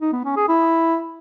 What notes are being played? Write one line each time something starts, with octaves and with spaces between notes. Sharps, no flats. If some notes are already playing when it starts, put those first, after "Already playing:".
D#4
B3
C#4
G#4
E4